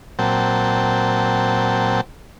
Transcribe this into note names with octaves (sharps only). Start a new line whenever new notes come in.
A#2 F#3 C4 G5 A5